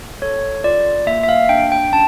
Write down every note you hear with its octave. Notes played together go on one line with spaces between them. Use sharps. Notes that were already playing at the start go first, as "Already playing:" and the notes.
A4 C#5
F4 D5
A#3 E5
E5
F5
D4 G5
G5
C#4 A5